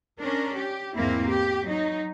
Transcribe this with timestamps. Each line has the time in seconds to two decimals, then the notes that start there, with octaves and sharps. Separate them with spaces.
0.20 C#4 D4 A#4
0.56 G4
0.95 E2 G#2 A#3 C4 E4
1.27 G4
1.65 F#3 D#4